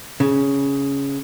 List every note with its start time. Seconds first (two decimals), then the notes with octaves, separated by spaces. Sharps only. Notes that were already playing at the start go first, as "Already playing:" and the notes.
0.20 C#3